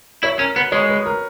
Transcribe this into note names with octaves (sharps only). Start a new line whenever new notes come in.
E4 C#5
C#4 A#4
B3 B4
G#3 C#5
B4
A#4